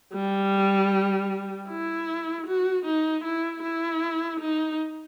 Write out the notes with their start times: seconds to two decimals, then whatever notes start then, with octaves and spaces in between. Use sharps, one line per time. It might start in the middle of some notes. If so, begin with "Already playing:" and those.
0.14 G3
1.69 E4
2.47 F#4
2.86 D#4
3.24 E4
3.63 E4
4.40 D#4